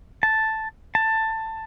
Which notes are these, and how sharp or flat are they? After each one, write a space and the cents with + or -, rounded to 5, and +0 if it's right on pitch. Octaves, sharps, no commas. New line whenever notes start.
A5 +0
A5 +15